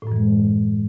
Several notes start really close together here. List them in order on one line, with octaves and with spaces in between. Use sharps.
A2 F#2 E3 G#3